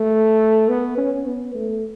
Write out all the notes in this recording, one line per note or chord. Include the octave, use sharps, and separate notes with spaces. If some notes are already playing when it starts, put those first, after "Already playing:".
Already playing: A3
B3
C#4
B3
A3